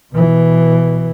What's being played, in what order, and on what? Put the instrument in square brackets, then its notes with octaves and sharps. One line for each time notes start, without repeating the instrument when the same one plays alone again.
[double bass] B2 E3